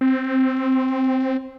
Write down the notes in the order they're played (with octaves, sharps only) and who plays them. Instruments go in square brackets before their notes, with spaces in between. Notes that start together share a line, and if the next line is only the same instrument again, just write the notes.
[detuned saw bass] C4